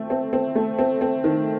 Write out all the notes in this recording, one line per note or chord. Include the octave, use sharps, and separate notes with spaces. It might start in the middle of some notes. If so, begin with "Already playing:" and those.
Already playing: A3 C4
C4
C4
A3
C4
C4
D#3